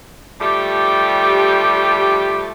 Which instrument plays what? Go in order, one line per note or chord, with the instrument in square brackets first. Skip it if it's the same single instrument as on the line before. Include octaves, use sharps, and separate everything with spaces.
[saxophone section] F3 G3 A3 G4